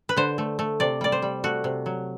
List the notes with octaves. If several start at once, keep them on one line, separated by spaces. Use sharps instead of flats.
B4
D3 C5
A3
A3
C3 D5
G3 D5
C5
G3
A3 F#4
C3
F#3